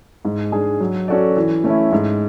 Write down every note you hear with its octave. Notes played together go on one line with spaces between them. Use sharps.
G#2
G#3 D4 G#4
F#3
C#4 F#4 A4 D5
E3
A3 C#4 E4
G#2